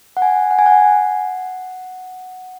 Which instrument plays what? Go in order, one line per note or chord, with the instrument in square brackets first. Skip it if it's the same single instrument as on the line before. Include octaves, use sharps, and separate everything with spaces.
[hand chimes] F#5
G#5
F#5
G#5
F#5